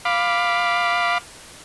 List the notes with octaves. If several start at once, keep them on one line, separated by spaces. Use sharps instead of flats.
F5 B5 D6